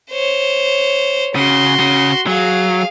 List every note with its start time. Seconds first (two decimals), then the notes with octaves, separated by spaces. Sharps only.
0.12 C5 C#5
1.36 C#3 F#4 C6
1.80 C#3
2.27 F#3 G#4 F5